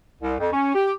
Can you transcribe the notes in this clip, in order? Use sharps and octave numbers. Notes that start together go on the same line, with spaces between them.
C2
F2
C#4
G4